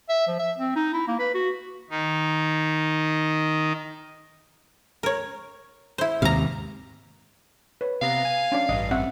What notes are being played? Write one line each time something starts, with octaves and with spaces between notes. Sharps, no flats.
E5
F3
E5
C4
D#4
E4
A#3
B4
F#4
D#3 D#4
A#4 C#5
E4 C5
D#2 G#2 C3 F5 A#5
B4 C#5
C3 B3 F5 A#5
G#5
C#4 D4 D5
A1 G2 D#5
C4 E5 F#5